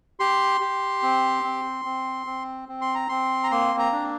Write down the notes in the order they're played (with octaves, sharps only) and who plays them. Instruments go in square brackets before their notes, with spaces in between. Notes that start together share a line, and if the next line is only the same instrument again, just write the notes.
[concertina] G4 C6
G4
C4
C4
C4
C4
C4
C6
A#5
C4 C6
A#5
A#3 C6
A#5
D4